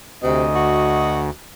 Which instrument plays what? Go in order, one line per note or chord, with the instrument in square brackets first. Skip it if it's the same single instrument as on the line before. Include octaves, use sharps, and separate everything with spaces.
[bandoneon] D2 [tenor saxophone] C3 [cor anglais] D#5
[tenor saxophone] F#4